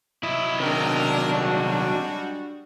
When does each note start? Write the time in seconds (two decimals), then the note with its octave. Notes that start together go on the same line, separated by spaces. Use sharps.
0.23 F#3 E4 D#5
0.60 C3 D#3 D4 A#4
1.32 G3 G#3 F#4